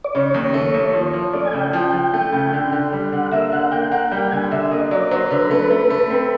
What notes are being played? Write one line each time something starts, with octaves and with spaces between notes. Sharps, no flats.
D5
C#3 C#5
D#2
A3
D#2
F3
F3
A3 D5
G#5
C#3 G5
F3 G5
F3
A3
C#3
D3
D3
G3
D3 F#5
A#3 E5
D3 F#5
A#3 G5
A#3 F#5
G3 G5
D3 G#5
D3 E5
A#3 D#5
F#3 D5
F#3 C5
D3 B4
A3
A3
A3
C4